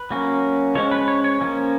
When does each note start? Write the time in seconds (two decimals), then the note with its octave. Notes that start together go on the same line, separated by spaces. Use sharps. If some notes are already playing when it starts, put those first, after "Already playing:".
Already playing: B4
0.11 F#3 A#3 C#4
0.75 F3 G#3 C#4 C#5
0.91 B4
1.08 C#5
1.24 C#5
1.41 F3 A#3 C#4